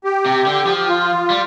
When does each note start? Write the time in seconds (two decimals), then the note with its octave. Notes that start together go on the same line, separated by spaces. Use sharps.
0.04 G4
0.26 C3
0.46 D3
0.67 F3
0.77 G4
0.88 F4
1.30 G3